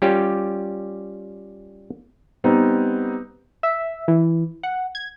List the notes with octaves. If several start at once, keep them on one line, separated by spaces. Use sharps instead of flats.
G3 C#4 F4 G4
G3 B3 C4 D#4
E5
E3
F#5
G#6